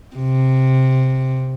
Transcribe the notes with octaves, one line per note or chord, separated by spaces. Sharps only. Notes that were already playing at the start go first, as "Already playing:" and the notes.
C3